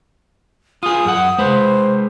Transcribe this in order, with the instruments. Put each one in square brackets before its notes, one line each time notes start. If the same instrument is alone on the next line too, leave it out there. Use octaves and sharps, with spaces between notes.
[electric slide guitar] F4 G#4 [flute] D#6
[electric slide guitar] F#2 F#5
[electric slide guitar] G#3 B4 [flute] C5